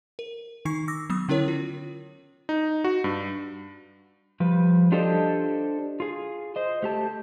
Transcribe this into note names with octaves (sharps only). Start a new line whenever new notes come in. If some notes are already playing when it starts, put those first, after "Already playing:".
A#4
D#3 D#4 C#6 C7
D6 E6 A#6
F#3 B3 D#6
D3 C#4 E4 A#4 C#5
F4
D#4
F#4
G2
F3 G3 B4
D4 F4 G4 A4 C5 D#5
F4 G#4
C5 D#5
A3 G4 A5